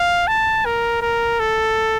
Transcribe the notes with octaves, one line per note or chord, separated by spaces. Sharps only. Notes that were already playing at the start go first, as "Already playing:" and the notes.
Already playing: F5
A5
A#4
A#4
A4